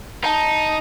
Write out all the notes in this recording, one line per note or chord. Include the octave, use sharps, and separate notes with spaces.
D#4 A5